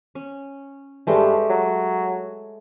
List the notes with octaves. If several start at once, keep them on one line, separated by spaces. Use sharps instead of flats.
C#4
G2 G#3 A3 G4
F#3